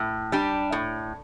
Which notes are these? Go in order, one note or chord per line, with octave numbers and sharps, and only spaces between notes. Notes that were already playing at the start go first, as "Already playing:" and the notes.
Already playing: A2
G3 D4 G4
A2